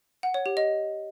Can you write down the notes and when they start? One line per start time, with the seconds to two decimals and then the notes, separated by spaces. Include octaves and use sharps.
0.23 F#5
0.34 C#5
0.46 G4
0.57 D#5